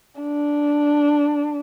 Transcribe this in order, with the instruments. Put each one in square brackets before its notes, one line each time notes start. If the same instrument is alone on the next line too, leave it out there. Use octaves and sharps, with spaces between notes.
[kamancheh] D4